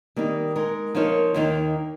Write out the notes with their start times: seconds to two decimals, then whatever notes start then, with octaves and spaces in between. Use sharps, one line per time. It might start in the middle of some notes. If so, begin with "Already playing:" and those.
0.16 D#3 G3 A#3 D#4
0.56 G#3 D#4 A#4
0.95 F3 A#3 D#4 A#4 C#5
1.34 D#2 D#3 A#3 D#4